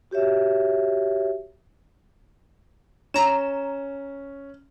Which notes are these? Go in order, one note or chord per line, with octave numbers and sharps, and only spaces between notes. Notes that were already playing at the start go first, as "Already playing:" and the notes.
F#4 G4 C#5 E5
C#4 A#5 E7